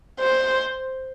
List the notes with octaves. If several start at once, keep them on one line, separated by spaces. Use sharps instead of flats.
C5